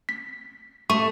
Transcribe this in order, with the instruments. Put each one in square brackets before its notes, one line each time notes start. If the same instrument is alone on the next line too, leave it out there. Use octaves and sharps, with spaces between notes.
[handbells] B6
[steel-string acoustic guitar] A3 [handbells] C#6